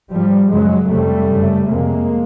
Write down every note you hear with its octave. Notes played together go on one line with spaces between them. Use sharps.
G#2 F3 G3
F#2 C#3 F#3 G#3
F2 C3 G3 A3
F#2 C#3
F2 C3 G#3 A#3